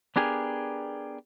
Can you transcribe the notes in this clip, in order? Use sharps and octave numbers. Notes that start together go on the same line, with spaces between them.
B3 D4 G4 G#4 A#4